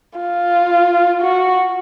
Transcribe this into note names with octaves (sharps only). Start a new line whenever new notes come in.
F4
F#4